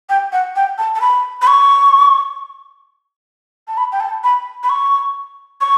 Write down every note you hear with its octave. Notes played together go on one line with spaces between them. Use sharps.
G5
F#5
G5
A5
A5
B5
B5
C#6
A5
B5
G5
A5
B5
B5
C#6
C#6